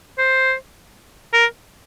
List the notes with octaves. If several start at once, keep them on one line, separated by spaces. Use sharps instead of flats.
C5
A#4